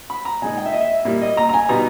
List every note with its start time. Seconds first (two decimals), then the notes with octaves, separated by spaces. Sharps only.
0.10 B5
0.25 A#5
0.42 A#2 G#3 D#4 G#5
0.58 G5
0.66 E5
0.73 D#5
0.81 E5
1.05 A#2 G3 A#3 E4
1.22 D#5
1.37 A#5
1.49 A#5
1.54 G#5
1.69 B2 G3 B3 D#4 A#5